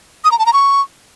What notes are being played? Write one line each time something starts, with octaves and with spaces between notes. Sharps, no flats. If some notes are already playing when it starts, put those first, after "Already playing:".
D#6
A#5
A5
A#5
C#6